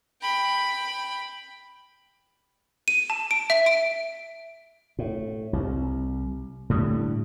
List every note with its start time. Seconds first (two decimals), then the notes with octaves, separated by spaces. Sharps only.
0.22 G5 B5
2.88 D#7
3.10 A5
3.31 D7
3.50 E5
3.66 D7
4.99 A2
5.53 C2
6.70 A2 D3 G3